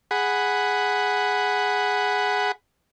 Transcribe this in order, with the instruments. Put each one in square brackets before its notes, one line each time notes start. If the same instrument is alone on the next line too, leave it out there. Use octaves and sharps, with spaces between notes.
[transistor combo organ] G#4 F#5 B5